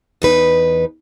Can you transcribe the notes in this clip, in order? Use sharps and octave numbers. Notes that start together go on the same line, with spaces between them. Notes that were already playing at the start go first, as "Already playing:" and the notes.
E2 D#4 B4